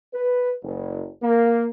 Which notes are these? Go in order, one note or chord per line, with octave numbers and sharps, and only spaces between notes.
B4
F#1
A#3